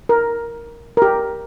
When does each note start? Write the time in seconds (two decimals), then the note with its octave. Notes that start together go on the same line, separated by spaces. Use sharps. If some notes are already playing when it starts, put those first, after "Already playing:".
0.09 A#4
0.97 A#4
1.02 G4